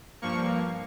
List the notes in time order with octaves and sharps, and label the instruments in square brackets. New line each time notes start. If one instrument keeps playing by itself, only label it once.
[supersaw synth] G2 F3 A#3 C#6